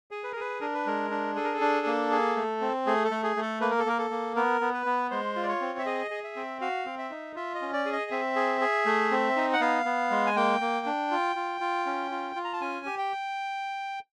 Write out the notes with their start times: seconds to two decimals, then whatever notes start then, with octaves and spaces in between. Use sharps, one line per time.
0.11 G#4
0.24 B4
0.32 A#4
0.36 G#4 B4
0.61 D4 A#4
0.74 B4
0.86 G#3 A#4
1.11 D4
1.36 G#4 A4
1.44 A#4
1.54 A4
1.61 D4
1.86 A#3
2.11 G#4
2.36 A3
2.61 C4
2.86 A3 G#4
3.05 A4
3.11 A3
3.24 G#4
3.36 A3
3.42 A4
3.61 A#3 B4
3.71 A#4
3.79 A4
3.86 A#3 A#4
3.99 A4
4.10 A#3
4.36 B3 A#4
4.61 B3
4.74 B4
4.86 B3
5.11 G#3 C5
5.36 F4
5.43 D5
5.49 C#5
5.61 C4
5.79 E5
5.86 G#4 D#5
6.11 G#4
6.24 E5
6.36 C4
6.61 F#4 F5
6.86 C4
6.98 E5
7.10 D#4
7.35 F4 E5
7.55 D#5
7.62 C#4
7.73 D5
7.86 G#4
7.93 D#5
8.11 C4 E5
8.36 G#4
8.61 G#4
8.86 A3
9.11 C4
9.36 D#4
9.53 F#5
9.61 B3 F5
9.85 B3
10.11 G#3
10.27 G#5
10.36 A#3 G5
10.61 A#3
10.86 D4
11.11 F4
11.36 F4
11.61 F4
11.86 C#4
12.11 F4
12.36 F4
12.45 A#5
12.53 A5
12.61 C#4 G#5
12.86 G4
12.98 G5